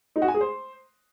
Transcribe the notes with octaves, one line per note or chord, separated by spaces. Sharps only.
D#4
F#4
G#5
G#4
C5